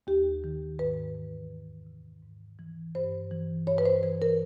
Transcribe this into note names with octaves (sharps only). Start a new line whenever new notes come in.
D#2 G4
D#3
G#2 B4
E3
F2
C3
G#2
E3
G2 C5
E3
G2 C#5
B4
C5
E3 B4
A#4